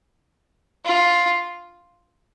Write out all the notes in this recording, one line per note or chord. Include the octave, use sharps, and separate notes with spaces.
F4